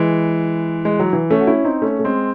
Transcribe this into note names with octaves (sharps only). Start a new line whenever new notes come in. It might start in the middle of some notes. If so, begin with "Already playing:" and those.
Already playing: E3 G#3
G#3
F#3
E3
A3 C#4
F#4
C#4 E4
C4 D#4
A3 C#4
A3
G#3 C4